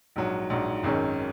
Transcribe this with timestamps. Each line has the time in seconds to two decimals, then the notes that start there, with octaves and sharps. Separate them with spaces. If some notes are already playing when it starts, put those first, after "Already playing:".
0.16 A#1 G#2 F#3
0.50 A#1 G#2 F#3
0.84 G#1 F#2 D#3 G#3 C#4